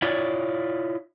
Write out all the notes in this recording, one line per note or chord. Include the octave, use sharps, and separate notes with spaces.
E4 F4 C#5 D5